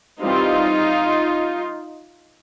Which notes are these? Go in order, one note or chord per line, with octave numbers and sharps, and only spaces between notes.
E3 G3 C4 D#4 F4